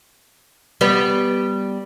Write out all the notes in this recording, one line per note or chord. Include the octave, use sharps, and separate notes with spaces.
G3 B3